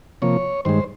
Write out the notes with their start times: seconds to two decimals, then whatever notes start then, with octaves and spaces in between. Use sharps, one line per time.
0.22 C3 F3 A#3 C#5
0.65 G2 D#3 G#3 C5